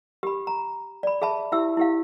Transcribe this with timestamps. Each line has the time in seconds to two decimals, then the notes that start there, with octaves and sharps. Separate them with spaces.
0.23 G4 B5
0.47 A#5
1.03 D5 B5
1.22 G#4 E5 A5 B5
1.52 E4 G4 E5 E6
1.77 E4 G4 F5